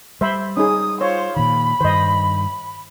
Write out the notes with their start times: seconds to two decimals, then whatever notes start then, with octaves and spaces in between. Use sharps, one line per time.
0.21 G3 C5 E5 B5
0.57 C#4 D#4 G#4 D#6
1.01 F4 C5 C#5
1.36 A#2 D#3 B5
1.81 G2 D#3 C5 D#5